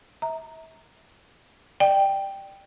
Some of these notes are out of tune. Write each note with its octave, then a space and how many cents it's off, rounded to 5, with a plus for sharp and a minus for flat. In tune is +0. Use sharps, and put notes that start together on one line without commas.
E5 -35 A#5 +0
D5 +20 G5 +0